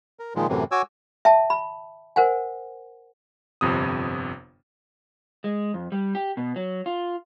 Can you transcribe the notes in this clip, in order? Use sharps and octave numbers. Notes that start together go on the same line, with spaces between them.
A#4
A#2 D#3 F3 G#3
F#2 A2 C3 E3
F#4 C#5 G#5 D6 E6
E5 G5 A5
B5
A#4 C5 F#5 G#5
G1 F2 C3 D#6
G#3
F2
G3
G4
B2
F#3
F4